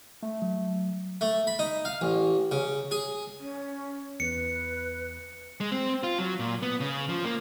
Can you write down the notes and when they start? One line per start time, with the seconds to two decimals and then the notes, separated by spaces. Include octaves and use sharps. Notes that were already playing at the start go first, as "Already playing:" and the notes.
0.22 A3
0.42 F#3
1.21 A3
1.47 B5
1.59 D#4
1.85 F5
2.01 A1
2.51 C#3
2.91 G#4
3.40 C#4
4.20 E2 B4 C#7
5.60 G#3
5.72 C4
6.03 F4
6.18 F#3
6.39 A#2
6.62 B3
6.80 C#3
7.09 F3
7.25 A#3